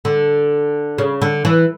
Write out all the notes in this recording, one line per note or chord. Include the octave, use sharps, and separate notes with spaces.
D3
C#3
D3
E3